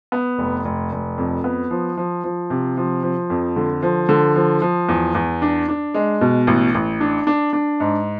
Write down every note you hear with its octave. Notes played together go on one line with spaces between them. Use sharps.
B3
F1
F1
F1
F2
B3
F3
F3
F3
C3
F3
F3
F2
D3
F3
D3
F3
F3
E2
E2
D4
D4
G#3
B2
A1
A1
D4
D4
D4
G#2